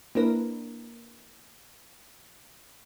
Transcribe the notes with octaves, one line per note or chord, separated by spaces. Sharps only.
A#3 D4 E4 A#4 B4